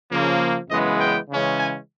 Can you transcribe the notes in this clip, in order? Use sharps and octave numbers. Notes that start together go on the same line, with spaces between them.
C#3 F3 A#3
F#2 C#3 E3 G#3 B3 D#5
G5
C#3 E3 G#3 C#4
G#5